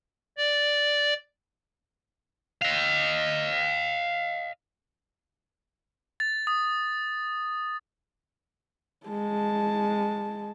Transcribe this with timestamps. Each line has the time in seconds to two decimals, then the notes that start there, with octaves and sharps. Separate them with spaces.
0.37 D5
2.62 D#5 F5
6.20 A6
6.47 D#6
9.06 G#3 A5